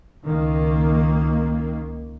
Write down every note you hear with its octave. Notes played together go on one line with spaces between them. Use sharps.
C#2 D#3 A#3